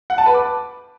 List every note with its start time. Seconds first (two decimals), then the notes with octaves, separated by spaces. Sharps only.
0.10 F#5
0.18 A5
0.26 B4
0.34 D6